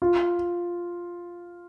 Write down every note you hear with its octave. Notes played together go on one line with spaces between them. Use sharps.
F4